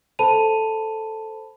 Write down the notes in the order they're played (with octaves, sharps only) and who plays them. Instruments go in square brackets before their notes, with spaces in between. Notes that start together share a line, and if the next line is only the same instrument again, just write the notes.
[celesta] A4 C5 A5 B5 D#7 F7